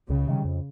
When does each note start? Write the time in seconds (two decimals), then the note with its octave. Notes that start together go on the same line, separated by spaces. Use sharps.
0.09 C#2 C#3
0.27 C3 D#3 G3
0.45 F2